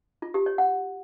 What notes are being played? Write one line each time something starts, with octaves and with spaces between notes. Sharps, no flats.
F4
G4
C#5
F#5